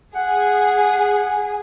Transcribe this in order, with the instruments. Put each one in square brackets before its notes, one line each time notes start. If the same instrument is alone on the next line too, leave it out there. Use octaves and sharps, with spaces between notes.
[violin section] G#4 [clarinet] F#5